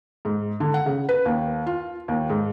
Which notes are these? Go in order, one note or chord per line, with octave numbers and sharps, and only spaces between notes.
G#2
D3
F#5
C#3
B4
D#2
F4
D#2
G#2